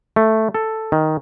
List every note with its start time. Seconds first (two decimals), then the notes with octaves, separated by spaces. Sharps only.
0.16 A3
0.54 A4
0.92 D#3